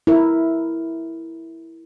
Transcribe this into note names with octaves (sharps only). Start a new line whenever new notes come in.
E4 A#4